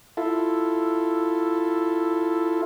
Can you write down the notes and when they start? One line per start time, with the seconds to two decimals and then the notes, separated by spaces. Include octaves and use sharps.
0.17 E4 F4 A4